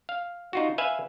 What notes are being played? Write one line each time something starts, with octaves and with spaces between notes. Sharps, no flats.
F5
D#4 F4 F#4
B4 E5 F5 G#5